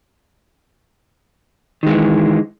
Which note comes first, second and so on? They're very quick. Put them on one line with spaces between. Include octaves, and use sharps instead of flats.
D#3 G#3 E3